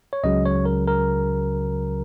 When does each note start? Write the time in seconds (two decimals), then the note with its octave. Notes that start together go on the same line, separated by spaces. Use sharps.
0.13 C#5
0.24 C#2 C#3 F#3 D#5
0.45 C#5
0.65 A#4
0.87 A#4